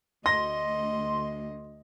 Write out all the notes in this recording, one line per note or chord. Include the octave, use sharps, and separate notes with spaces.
D2 D#5 C6 A#6